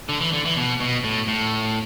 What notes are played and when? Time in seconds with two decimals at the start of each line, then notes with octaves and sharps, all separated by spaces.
0.09 D3
0.21 E3
0.33 D3
0.45 E3
0.56 B2
0.81 B2
1.04 A2
1.28 A2